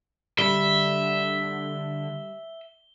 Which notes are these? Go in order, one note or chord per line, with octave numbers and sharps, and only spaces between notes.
D3 G3 E5 G7